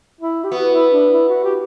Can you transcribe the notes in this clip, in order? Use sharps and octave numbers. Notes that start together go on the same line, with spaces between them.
E4
G4
B3 F#4
E4
D4
E4
F#4
G4